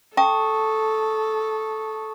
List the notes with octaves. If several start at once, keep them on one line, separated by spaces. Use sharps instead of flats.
A4 G5 A5 C#6 D#6